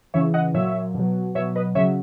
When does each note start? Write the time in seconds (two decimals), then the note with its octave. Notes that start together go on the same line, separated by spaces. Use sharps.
0.14 C#3 E3 C#5 E5
0.34 D#5 F#5
0.54 A#2 F#3 C#5 E5
0.95 B2 F#3
1.35 B2 C#5 E5
1.38 F#3
1.55 B4 D#5
1.75 C#3 C#5 E5
1.79 F#3